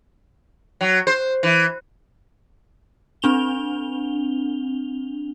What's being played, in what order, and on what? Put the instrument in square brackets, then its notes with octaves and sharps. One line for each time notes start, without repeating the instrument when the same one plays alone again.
[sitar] F#3
C5
E3
[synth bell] C4 D4 F7 G7